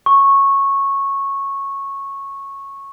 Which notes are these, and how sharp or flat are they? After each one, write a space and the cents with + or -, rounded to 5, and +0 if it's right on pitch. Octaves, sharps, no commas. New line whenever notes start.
C#6 -10